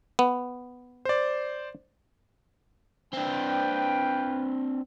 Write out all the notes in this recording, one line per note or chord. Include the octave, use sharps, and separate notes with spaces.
B3
C5 D5
C4 D4 B4 F5 G5